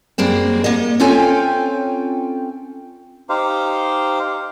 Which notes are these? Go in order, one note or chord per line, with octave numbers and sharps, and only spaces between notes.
F#2 G3 G#3 A#3 C4
A#3 D#5
C4 C#4 F4 A4 G5 G#5
D#4 G4 C5 F5